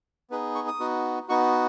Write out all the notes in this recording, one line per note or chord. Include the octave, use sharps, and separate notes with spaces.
B3 D#4 G#4 B4
C#6
D#6
B3 D#4 F#4
B3 D#4 F#4 C#6